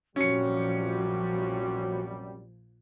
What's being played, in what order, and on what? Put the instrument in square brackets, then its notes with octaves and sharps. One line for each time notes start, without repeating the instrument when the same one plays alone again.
[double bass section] A#1 F3 [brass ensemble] F#2 C3 G3 [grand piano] C#4 C#7 [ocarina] F#4